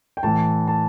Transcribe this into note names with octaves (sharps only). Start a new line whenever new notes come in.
G5
A2 E3 A5
A5